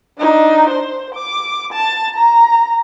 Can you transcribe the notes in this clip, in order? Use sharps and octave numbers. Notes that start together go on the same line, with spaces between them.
D4 D#4
C5
D6
A5
A#5